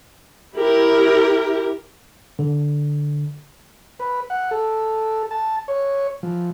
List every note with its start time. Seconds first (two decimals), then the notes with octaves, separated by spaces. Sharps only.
0.57 E4 G4 A#4
2.39 D3
3.99 B4
4.30 F#5
4.51 A4
5.31 A5
5.68 C#5
6.23 F3